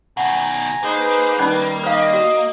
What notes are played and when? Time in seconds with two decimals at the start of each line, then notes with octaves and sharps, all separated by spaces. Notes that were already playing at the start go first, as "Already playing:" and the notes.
0.17 B2 D#3 F#5 G#5 A#5
0.84 A#3 D#4 G#4 B4 C5
1.39 D#3 G3 C#4 D#4 B5
1.84 B4 D#5 F5
2.13 F#4